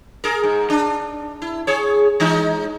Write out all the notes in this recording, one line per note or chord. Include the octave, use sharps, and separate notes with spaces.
G#4 A#4
G#2
D4
E4
G#4 C#5
E3 G#3 D#4